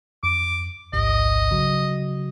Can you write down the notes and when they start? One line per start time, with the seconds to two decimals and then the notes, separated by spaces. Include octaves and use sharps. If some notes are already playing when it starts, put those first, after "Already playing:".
0.23 F2 D6
0.93 A1 D2 G#2 D#5
1.51 C#3 F#3 F#4